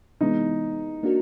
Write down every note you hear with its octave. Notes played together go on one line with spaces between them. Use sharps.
C3 E3 G#3 B3 D#4
A#3 D4 F#4 A#4